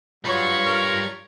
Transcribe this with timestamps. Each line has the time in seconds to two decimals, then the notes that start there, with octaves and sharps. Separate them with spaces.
0.25 F#3 G3 F4 B4 C#5 C#6
0.65 A#4